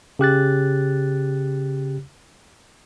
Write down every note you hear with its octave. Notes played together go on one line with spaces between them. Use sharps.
C#3 G4 F#6 A6